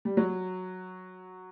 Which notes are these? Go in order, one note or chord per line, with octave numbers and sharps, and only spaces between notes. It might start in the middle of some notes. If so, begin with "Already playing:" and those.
G3
F#3